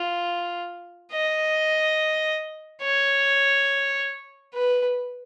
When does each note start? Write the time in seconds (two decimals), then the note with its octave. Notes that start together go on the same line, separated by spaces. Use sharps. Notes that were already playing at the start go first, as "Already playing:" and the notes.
Already playing: F4
1.12 D#5
2.82 C#5
4.54 B4